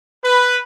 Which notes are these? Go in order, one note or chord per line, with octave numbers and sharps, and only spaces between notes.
B4